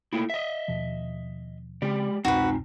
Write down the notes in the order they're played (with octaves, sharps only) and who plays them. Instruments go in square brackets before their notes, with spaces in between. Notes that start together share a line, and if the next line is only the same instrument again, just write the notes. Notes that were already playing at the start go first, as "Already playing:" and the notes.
[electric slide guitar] A3 A#3 E4
D#5 E5
[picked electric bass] D#2 B2 F3
[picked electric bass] C#3 C4 [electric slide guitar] G#3 G4 D5
[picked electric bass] C2 F2 B2 [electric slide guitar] C4 D#4 [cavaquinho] F#4 B4